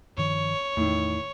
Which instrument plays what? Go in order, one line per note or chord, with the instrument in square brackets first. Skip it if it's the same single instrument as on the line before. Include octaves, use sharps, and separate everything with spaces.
[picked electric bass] G2 D#3 F3 [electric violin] C#5
[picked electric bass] E2 [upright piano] A2 D#3